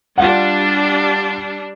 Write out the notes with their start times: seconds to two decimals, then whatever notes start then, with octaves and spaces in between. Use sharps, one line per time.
0.18 G3 D4 F4 F5 F#5